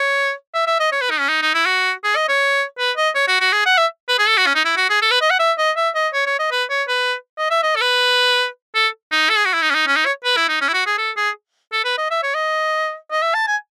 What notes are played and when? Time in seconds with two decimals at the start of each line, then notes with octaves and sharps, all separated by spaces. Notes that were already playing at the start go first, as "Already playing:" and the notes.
Already playing: C#5
0.54 E5
0.67 E5
0.80 D#5
0.92 C#5
1.01 B4
1.11 D#4
1.19 C#4
1.29 D#4
1.42 D#4
1.54 E4
1.66 F#4
2.04 G#4
2.16 D#5
2.29 C#5
2.79 B4
2.97 D#5
3.15 C#5
3.28 F#4
3.40 F#4
3.53 G#4
3.66 F#5
3.78 E5
4.09 B4
4.19 G#4
4.28 A4
4.37 F#4
4.46 C#4
4.55 D#4
4.65 E4
4.77 F#4
4.90 G#4
5.02 A4
5.11 B4
5.21 D#5
5.31 F#5
5.40 E5
5.58 D#5
5.76 E5
5.95 D#5
6.14 C#5
6.26 C#5
6.39 D#5
6.51 B4
6.70 C#5
6.88 B4
7.38 D#5
7.51 E5
7.63 D#5
7.76 A4
7.81 B4
8.75 A4
9.12 D#4
9.30 A4
9.37 G#4
9.45 F#4
9.54 E4
9.62 D#4
9.70 C#4
9.75 D#4
9.87 C#4
9.96 D#4
10.06 C#5
10.25 B4
10.37 E4
10.49 D#4
10.61 C#4
10.68 E4
10.74 F#4
10.86 G#4
10.98 A4
11.17 G#4
11.72 A4
11.85 B4
11.98 D#5
12.11 E5
12.23 C#5
12.35 D#5
13.11 D#5
13.22 E5
13.34 A5
13.48 G#5